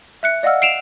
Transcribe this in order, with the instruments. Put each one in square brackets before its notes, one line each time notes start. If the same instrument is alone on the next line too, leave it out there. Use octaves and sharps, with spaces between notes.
[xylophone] E5 F#6 C#7
D5 D#5 F5 F#5 E6 F6
C7 D7 E7 F7